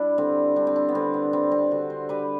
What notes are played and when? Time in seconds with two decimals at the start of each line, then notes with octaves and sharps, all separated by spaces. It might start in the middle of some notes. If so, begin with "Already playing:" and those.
Already playing: G3 D4 E4
0.18 D3 C4
0.56 G3 D4
0.67 C4
0.76 D4
0.89 B3
0.95 D3 C4
1.14 B3
1.33 G3 C4
1.52 C4
1.71 D3 F#4
1.90 C5
2.09 G3 B4